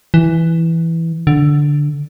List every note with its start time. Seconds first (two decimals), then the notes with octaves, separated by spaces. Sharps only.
0.14 E3
1.27 D3